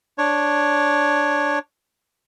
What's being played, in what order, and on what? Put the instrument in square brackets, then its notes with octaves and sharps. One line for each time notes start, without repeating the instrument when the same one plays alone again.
[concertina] D4 C#5